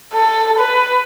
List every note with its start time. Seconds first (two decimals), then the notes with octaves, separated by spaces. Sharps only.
0.13 A4
0.59 B4